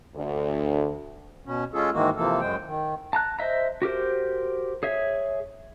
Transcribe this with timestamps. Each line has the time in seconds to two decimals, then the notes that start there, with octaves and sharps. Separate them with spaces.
0.15 D2
1.46 B2 C#4
1.74 G#3 C#4 F4 G#4 A4
1.93 G#2 D#3 E3 G#3 A#3 F#4
2.16 C3 E3 F3 A#3 A4
2.40 F#2 G#3 C5 G5
2.66 D#3
3.13 A5 A#5 F#6
3.39 C5 D#5 E5 A#5
3.82 F#4 G4 A#4 C5
4.83 G#4 C#5 E5